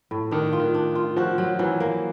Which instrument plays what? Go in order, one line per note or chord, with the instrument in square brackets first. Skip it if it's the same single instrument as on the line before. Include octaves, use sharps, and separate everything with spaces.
[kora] A2
[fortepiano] D#3 [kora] D4
[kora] F4
[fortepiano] D#3
[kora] D4
F4
[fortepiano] F3 [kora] F#4
[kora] F#3
[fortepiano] E3 [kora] F#3
[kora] A#3